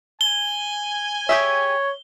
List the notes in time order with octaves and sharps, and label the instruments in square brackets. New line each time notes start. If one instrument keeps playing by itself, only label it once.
[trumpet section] G#5 [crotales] G7
[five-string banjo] G4 G#4 E5 [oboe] C#5